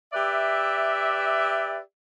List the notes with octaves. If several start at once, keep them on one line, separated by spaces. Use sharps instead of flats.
G4 B4 D5 E5